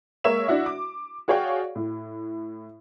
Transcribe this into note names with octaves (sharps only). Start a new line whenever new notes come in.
G#3 A#3 A#4 C#5 E5 E7
D4 E4 F#4 E5
D6
F#4 G#4 C#5 D5 F5 G5
A2